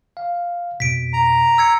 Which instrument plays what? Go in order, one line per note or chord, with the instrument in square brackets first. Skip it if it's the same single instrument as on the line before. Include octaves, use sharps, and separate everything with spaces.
[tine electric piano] F5
[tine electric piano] F2 B2 [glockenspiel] B6 D7
[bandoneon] A#5
[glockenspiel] E6 G#6 C#7